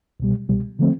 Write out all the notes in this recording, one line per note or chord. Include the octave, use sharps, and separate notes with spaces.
C2 B2 G3
C2 B2 G3
D3 F3 A3 C4